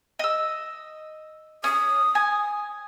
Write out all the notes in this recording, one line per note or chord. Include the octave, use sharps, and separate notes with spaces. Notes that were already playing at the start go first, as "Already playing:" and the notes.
D#5 E6
C#4 D#6
G#5